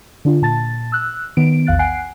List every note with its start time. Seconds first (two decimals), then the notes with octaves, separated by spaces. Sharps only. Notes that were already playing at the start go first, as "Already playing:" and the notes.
0.25 D3 D4 F4
0.42 A#2 A5 A6
0.92 E6 F#6
1.37 D#3 B3 D7
1.67 A#1 E2 F5 F#6 A6
1.79 F#5 G#5 F#6 C7 D7